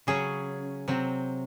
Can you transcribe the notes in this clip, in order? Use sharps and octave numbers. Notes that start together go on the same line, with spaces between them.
C#3 F#3 C#4 G#4
C3 F#3 C4